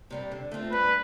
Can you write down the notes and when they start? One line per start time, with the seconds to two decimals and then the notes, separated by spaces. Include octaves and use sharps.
0.10 C3 G3 C4
0.31 D3
0.52 A3 C4 F4
0.72 G2 B4